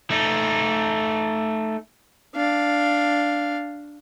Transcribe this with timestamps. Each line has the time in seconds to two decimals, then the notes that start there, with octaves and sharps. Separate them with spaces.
0.10 A3 D#4
2.35 D4 F5